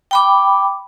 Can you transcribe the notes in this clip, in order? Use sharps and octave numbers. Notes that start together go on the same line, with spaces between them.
G5 B5 D6